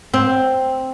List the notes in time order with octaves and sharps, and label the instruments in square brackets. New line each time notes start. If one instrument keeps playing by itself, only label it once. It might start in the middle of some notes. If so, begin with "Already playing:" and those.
[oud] C4